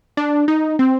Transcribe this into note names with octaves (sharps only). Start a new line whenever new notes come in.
D4
D#4
C4